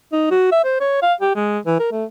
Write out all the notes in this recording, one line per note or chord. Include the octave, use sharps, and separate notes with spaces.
D#4
F#4
E5
C5
C#5
F5
G4
G#3
E3
A#4
A3